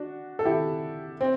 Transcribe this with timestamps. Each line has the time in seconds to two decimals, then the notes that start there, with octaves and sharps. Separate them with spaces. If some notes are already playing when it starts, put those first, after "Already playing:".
Already playing: D4 F#4
0.39 A4
0.45 E4 G4
1.21 C4